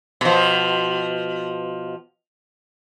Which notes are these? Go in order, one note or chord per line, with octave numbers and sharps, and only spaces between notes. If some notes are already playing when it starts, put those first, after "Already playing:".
B2 F3